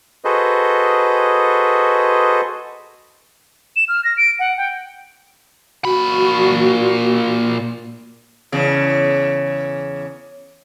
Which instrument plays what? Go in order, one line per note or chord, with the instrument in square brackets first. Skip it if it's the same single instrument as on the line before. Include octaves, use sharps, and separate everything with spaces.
[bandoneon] F#4 G#4 A4 B4 C5 D#5
[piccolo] E7
F6
A#6
D7
F#5
G5
[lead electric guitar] A#2 B5 [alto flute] F#4
[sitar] E2 C#3